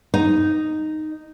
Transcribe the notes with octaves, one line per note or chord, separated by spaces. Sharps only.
D#4